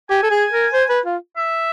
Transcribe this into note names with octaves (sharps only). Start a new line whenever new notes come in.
G4 G#5
A4
G#4
A#4
C5
B4
F4
E5